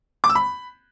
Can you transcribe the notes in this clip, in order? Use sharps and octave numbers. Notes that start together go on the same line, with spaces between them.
D6
E6
B5